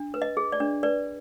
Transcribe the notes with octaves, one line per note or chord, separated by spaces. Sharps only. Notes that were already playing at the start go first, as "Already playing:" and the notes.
Already playing: D4
B4
D#5
G#4
D5
D4
B4 D5